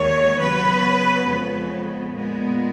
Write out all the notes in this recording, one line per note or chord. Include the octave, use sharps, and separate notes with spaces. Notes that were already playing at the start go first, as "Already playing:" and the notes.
Already playing: D#2 D#3 G#3 C#5
C#3 F#3 B3 B4
F2 C#3 G#3 B3
A#2 G#3 B3